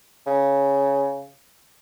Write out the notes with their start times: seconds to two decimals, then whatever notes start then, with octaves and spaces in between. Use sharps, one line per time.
0.27 C#3